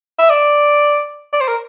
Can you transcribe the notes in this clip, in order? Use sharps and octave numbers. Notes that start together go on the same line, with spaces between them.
E5
D5
D5
C5
A#4